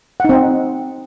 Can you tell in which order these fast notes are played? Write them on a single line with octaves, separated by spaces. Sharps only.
F#5 D#4 C4 D#5